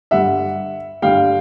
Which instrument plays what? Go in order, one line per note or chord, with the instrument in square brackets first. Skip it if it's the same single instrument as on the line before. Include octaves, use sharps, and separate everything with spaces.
[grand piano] G2 D3 G3 E5 F#5
G2 D3 G3 F5 G5